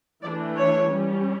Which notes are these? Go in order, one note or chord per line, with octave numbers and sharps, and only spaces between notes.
E3 A3 D4 D5
C#5
G3 C#4